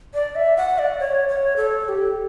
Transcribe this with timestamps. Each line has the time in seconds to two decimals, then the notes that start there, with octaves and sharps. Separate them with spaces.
0.14 D5
0.35 E5
0.57 F#5
0.79 D5
0.99 C#5
1.28 C#5
1.56 A4
1.85 A4
1.89 G4